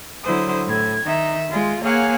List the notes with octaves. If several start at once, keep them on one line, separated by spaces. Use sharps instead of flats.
D3 F#3 E4 C5 D#6
A2 G#6
D#3 D#4 E5
G#3 F4
A#3 G#4 C#5 F5 F#5 G#5